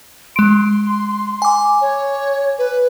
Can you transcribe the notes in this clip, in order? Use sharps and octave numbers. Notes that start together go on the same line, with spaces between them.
G#3 C6 D7
G#5 D6
C#5
B4